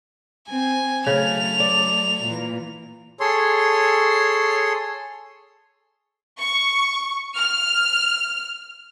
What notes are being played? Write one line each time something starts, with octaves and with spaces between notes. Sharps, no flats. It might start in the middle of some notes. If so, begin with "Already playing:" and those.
C4 G#5
C#3 F#3 A3 F7
D5
A#2 E3
G#4 A4 C#5 C6
C#6
F6